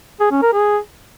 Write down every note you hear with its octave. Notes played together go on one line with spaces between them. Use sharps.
G#4
C#4
A#4
G#4